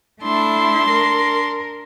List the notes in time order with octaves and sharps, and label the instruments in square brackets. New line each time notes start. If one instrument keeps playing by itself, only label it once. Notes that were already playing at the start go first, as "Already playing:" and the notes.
[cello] A3 E4 [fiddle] D4 C6
[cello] A#4